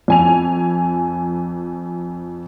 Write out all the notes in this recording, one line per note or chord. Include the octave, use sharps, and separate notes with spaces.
F2 G#5 F7